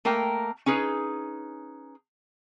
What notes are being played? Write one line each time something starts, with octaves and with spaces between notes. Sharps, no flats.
A3 A#3 A#4 G5
C#4 D#4 G#4 B4